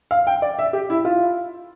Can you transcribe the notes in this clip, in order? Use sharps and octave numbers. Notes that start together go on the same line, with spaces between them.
F5
G5
D5
E5
G4
E4
F4